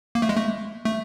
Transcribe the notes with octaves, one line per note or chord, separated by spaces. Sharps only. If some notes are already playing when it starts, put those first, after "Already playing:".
A#3
A3
G#3
A3
A3